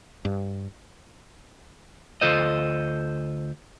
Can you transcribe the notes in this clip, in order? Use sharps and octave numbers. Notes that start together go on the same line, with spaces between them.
G2
D2 F4 A4 C5 D#5